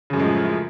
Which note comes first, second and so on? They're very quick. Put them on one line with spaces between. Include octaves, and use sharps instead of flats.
C#3 F#2 A2 G#3 F3